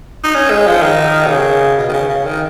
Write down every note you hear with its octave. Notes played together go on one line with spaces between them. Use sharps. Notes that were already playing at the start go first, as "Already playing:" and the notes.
D#4
C#4
G#3
F3
D#3
B2
C#3
B2
D#3
C#3
C#3
D#3